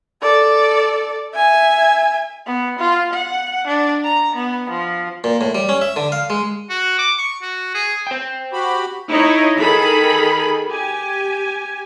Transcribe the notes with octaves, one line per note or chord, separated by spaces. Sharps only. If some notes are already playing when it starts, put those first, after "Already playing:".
A4 D5
E5 G#5
B3
F4
F#5
D4
A#5
B3
F3
A#2
A2
G3
C#4
E5
D3
F5
G#3
F#4
D6
C#6
F#4
G#4
C5 G5
F#4 G4 B5
D#4 E4 C#5 D#5 B5
D#3 G#4 A4 B5
G4 G#5